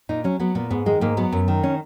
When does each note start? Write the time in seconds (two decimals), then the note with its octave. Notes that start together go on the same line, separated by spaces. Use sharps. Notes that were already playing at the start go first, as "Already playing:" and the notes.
0.09 A#2 D#4
0.24 F#3 C#4
0.40 F#3 B3
0.55 A#2 B3
0.70 G#2 B3
0.86 D#3 G#3
1.01 G#2 A#3
1.17 F#3 B3
1.32 F#2
1.48 D#3
1.63 C#4